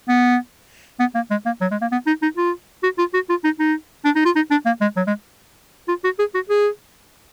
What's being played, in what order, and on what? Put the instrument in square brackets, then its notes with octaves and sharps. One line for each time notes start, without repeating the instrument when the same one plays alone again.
[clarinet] B3
B3
A#3
G#3
A#3
F#3
G#3
A#3
B3
D#4
D#4
F4
F#4
F4
F#4
F4
D#4
D#4
D4
D#4
F4
D#4
D4
A#3
G#3
F#3
G#3
F4
F#4
G#4
F#4
G#4